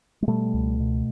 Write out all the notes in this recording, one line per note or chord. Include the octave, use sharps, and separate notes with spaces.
G#3
B2 G3 A3
C#2
B2